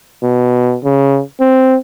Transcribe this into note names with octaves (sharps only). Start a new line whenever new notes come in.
B2
C#3
C4